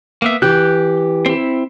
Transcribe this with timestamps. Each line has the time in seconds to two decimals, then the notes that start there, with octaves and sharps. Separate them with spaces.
0.22 A#3 B3 E5
0.42 E3 G4 F#6 G6
1.26 C4 E4